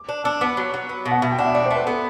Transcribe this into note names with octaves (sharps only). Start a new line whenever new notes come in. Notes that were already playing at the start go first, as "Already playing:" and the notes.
Already playing: D6
D4
D4 E6
B3 D6
F#3
F#3
B3
B2
F#5
B2 E5
G5
D4 F#5
E5
A3 D5
C5
A3 B4
B3 A4